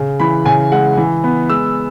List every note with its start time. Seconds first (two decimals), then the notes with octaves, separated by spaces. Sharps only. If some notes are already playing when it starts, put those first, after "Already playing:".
Already playing: C#3
0.20 E3 B5
0.46 C#3 G#5
0.72 G#3 F#5
0.97 E3
1.24 B3
1.50 G#3 E6